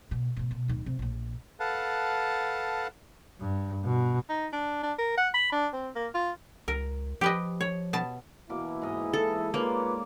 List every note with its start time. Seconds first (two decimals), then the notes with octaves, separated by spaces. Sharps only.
0.11 B2
0.37 G#2 B2
0.51 B2
0.68 D1 D#3
0.86 C3
0.99 A#1 A#2
1.60 A4 B4 F5 F#5 A5
3.40 G2
3.85 B2
4.29 D#4
4.53 D4
4.83 D4
4.98 A#4
5.17 F#5
5.34 B5
5.52 D4
5.73 C4
5.95 A#3
6.14 F4
6.68 C#2 A#4
7.21 F3 G4 B4 D#5
7.61 C#5
7.93 B2 A5
8.49 B2 E3 A#3 E4 D6
8.82 G#2 D#5 A#5
9.14 A4
9.54 A#3 F4 B4 C#5 D5